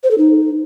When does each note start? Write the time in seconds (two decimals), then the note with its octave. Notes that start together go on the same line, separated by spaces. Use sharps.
0.04 C5
0.11 A4
0.18 D#4